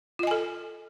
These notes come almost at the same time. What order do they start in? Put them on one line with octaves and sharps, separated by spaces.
F4 D#5 G#5 A4